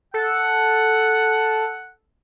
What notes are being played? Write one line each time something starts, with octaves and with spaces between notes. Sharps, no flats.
A4 F#5